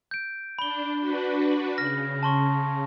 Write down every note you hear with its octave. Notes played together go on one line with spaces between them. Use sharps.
G6 D7
D4 B5 G7
D4 F#4 B4
C#3 F6 A#6
A5 C6 C#6